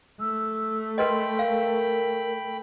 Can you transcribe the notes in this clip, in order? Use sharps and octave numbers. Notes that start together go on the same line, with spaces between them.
A3 E6
A#4 B4 D#5 G5 B5 C6
A#4 F5